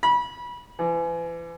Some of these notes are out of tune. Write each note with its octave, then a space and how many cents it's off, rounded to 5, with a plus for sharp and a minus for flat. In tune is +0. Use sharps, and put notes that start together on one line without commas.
B5 -25
E3 +35